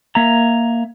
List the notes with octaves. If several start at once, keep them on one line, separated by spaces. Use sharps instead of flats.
A#3 E5 A#5